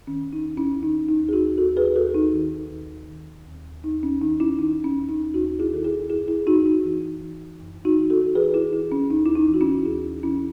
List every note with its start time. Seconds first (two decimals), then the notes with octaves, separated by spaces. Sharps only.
0.07 D#3 C#4
0.33 D#4
0.45 D#2
0.57 C#4 E4
0.83 D#3 D#4
1.08 D#4
1.20 D#2
1.29 G#4
1.33 D#4 F#4
1.58 D#2 F#4 A4
1.77 G#4 B4
1.95 D#2 F#4 A4
2.14 D#4
2.33 D#3
2.70 D#2
3.09 D#3
3.46 D#2
3.84 D#2 D#4
4.03 C#4
4.21 D#3 D#4
4.40 C#4 E4
4.59 D#3 D#4
4.84 C#4
4.97 D#2
5.09 D#4
5.34 D#2 D#4 F#4
5.59 E4 G#4
5.72 D#3 A4
5.84 E4 G#4
6.10 F#2 E4 G#4
6.28 E4 G#4
6.47 F#2 D#4 F#4
6.66 D#4
6.85 E3
7.22 E3
7.60 F#2
7.85 D#4 F#4
7.98 E3
8.10 F#4 A4
8.35 E3 G#4 B4
8.54 E4 G#4
8.73 E3 E4 G#4
8.92 C#4
9.10 D#2 D#4
9.26 E4
9.35 D#4
9.48 E3
9.54 F#4
9.61 C#4 E4
9.85 D#2 E4 G#4
10.23 E3 C#4 E4